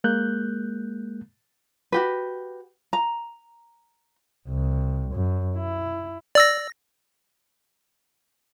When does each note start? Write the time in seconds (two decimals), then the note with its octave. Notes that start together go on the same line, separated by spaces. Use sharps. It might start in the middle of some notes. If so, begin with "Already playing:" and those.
0.04 G#3 A#3 F#6 G6
1.92 F#4 G4 B4
2.93 A#5
4.48 C2
5.14 F#2
5.56 E4
6.35 D5 E6 A#6